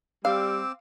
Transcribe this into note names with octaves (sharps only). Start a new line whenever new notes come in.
G3 C4 F5 D6 E6